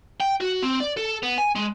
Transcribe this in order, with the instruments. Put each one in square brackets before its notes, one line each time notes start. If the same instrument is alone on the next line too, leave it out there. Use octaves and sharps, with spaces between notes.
[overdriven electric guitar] G5
F#4
C4
D5
A4
B3
G#5
G#3